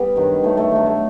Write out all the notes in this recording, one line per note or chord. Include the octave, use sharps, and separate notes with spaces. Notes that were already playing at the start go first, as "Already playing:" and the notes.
Already playing: G3 B3
G2 D#3 F#3
G2 D#3 F#3 A3
A3
G2 F#3 A3
A3